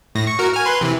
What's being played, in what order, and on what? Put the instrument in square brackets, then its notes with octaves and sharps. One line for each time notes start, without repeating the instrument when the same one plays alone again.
[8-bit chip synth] A2 A#6
C#6
F#4 A#4
G#5 F6
B4 C6
C3 E3